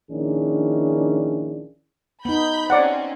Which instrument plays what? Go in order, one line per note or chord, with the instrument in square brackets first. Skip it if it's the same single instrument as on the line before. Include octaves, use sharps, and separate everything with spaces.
[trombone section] A#1 D#3 C#4 D4 E4 G#4
[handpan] B3 D#4 [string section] B5 G6
[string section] C4 C#4 [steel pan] D5 F#5